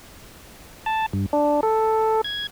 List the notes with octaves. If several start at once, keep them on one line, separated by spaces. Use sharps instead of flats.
A5
G2
D4
A4
G#6